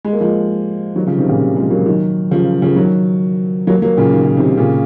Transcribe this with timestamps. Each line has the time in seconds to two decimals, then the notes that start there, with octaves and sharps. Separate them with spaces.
0.05 G#3
0.13 A#3
0.21 F3 G#3
0.95 D#3 F#3
1.07 C#3 F3
1.18 C3 D#3
1.29 A#2 C#3
1.40 C3
1.56 F3 G#3
1.70 F#3 A#3
1.86 D#3 F#3
2.31 C#3 F3
2.62 C#3 F3
2.76 D#3 F#3
3.67 F#3 A#3
3.82 F#3 A#3
3.97 A#2 C#3
4.13 D#3
4.25 C#3
4.37 C3 D#3
4.57 A#2 C#3